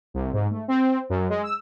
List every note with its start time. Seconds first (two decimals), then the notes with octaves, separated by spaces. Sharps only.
0.14 C2
0.33 G#2
0.51 A3
0.68 C4
1.10 F#2
1.29 G#3
1.43 E6